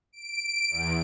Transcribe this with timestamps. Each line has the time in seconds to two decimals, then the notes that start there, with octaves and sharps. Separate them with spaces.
0.13 D7
0.70 E2